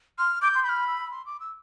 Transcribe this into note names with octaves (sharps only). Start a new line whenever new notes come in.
C6 F6
D6 G6
C6
B5 F6 G6
E6
C6
D6
E6